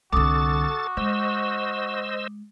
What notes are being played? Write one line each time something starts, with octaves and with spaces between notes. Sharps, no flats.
C2 D3 F#4 A4 D6 D#6 A6
G#3 C5 D#5 E6